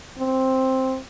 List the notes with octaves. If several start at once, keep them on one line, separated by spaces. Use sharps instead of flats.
C4